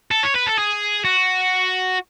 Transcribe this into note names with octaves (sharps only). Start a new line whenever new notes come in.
A4
C#5
B4
A4
G#4
F#4